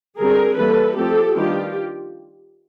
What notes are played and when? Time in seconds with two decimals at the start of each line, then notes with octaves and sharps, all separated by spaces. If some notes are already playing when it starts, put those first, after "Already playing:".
0.18 D3 G3 C4 G#4 A#4
0.57 E3 G3 A#3 A4 B4
0.96 F3 A3 C4 G4 A4
1.36 D#3 G3 B3 D4 F4 G4